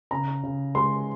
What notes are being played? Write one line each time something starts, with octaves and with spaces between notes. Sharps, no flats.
C#3 A#5
C#3
G#3 C6